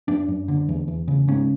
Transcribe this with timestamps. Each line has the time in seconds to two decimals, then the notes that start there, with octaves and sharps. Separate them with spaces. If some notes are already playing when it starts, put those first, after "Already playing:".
0.08 F#2 D4
0.28 F#2
0.48 D3
0.69 E2
0.88 E2
1.08 C#3
1.28 G#2 C#4